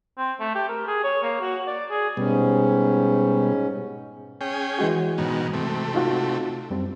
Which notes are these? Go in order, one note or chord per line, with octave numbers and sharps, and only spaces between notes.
C4
A3
G4
A#4
G#4
C#5
A#3
F#4
D5
G#4
G#2 B2 G3 C#4
C#4 G#4 G5
E3 G#3 F#4
G#2 B2 D#3
C3 A3
D#4 F4 F#4
F#2 G3 C4